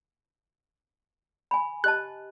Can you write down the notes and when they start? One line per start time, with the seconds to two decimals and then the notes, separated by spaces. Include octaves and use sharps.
1.51 G#5 B5
1.84 G4 D#5 A5 F#6